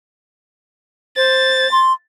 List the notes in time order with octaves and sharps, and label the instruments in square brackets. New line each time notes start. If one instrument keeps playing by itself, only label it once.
[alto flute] C5 [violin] A6
[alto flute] C6